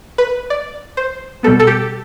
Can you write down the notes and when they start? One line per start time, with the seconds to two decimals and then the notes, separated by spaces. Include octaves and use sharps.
0.18 B4
0.50 D5
0.97 C5
1.43 B2 G3 B3 A4
1.60 A4
1.67 G4